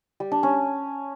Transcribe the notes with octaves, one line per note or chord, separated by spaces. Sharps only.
G3
D4
C#4